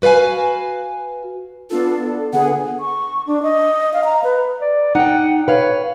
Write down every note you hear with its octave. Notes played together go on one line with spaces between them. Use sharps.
F#4 B4 D5 F5 G#5
B3 D4 F4 A4
D3 B3 G#4 F#5
C#6
D4
D#5
F5
A#5
B4
D5
D#4 F#5 G5
B4 C#5 F5